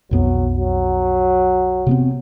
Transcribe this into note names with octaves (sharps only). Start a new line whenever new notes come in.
B1 F2 F#3 B3
F#3
C3 B3 C4